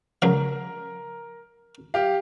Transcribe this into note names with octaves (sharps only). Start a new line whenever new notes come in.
C#2 F#3 A#4 F5
G4 F5